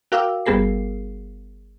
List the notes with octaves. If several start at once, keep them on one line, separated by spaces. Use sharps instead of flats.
F#4 A#4 F5 G5 D6 E6
G1 G3 B3 G#4 A#4 C7